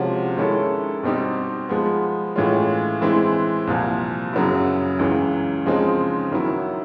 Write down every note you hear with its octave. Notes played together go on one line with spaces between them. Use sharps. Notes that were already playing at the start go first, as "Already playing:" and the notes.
Already playing: C3 F3 G#3 C#4 F#4
D#3 G#3 C#4 E4 A4
B2 G3 C4 D#4 G4
F3 G#3 B3
A2 E3 G#3 C#4 F4
E3 G#3 C4 E4
C2 A#2 F3
F#2 C#3 F#3 B3 E4
C#2 C#3 E3
C#3 F3 G#3 C4 D#4
D#3 F#3 B3 E4